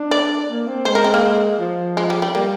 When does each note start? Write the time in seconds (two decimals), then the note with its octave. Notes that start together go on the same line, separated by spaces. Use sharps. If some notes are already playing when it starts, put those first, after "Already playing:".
Already playing: D4
0.11 D5
0.48 A#3
0.67 C4
0.85 G#3 C5
0.95 A#4
1.04 C4
1.14 A#3
1.60 F3
1.97 G#3
2.10 G3
2.22 G3
2.35 G3 A#3